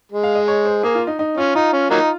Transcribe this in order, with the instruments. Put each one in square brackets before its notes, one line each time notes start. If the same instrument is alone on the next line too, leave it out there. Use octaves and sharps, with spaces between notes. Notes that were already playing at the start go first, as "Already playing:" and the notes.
[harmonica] G#3
[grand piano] F5
D#5
C#5
C5
[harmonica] A#3 [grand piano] G#4
[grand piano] F4
D#4
D#4
[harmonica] C#4 [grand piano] F4
[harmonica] D#4 [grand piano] F4
[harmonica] C#4
F#3 A#3 D#4